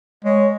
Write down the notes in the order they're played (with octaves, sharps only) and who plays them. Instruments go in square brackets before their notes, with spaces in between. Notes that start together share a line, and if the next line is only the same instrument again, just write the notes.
[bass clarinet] G#3 [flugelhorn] C#5